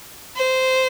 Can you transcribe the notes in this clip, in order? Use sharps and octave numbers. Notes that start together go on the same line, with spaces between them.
C5